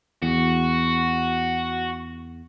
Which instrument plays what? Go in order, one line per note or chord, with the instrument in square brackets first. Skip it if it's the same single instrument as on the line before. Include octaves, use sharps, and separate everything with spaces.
[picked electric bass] E2 [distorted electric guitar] F#4